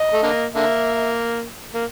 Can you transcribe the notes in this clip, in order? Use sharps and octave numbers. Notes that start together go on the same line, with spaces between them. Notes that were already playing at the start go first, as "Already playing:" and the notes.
Already playing: D#5
A3
D3 A#3
D3 A#3 E5
A#3